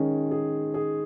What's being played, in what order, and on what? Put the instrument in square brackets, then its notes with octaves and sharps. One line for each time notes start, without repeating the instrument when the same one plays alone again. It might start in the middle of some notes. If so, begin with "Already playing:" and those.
Already playing: [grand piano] D#3 G#3 G#4 [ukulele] C#4
[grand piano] G#4
G#4